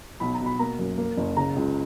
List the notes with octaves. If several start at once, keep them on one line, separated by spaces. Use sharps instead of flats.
B1 B5
A#5
B2
B5
A#3 A#5
F#2
A#3
F#1
C#3 A#5
C#2